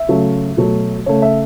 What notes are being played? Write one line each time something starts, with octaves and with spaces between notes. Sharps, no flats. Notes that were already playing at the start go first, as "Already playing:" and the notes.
Already playing: E5
C#3 F#3 A3
B2 F#3 A3
C#3 A3 C#5
E5